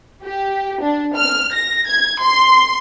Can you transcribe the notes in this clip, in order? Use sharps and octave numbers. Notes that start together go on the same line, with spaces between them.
G4
D4
F6
A#6
G#6
C6